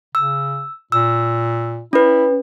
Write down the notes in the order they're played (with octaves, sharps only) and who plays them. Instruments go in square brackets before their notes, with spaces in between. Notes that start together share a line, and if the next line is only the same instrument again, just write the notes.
[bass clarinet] C#3 [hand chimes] E6
[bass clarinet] A#2 [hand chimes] E6
[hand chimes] C#4 B4 [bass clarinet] E4